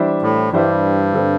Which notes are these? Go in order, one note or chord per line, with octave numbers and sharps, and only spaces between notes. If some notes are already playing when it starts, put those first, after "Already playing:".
Already playing: E3 G3 D4 C5 E5
A2
G2 E3 G3 D4 C5 E5
D3 C4 A4